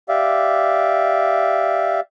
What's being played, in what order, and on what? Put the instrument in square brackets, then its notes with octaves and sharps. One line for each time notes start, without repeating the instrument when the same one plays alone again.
[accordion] G4 D5 E5 F5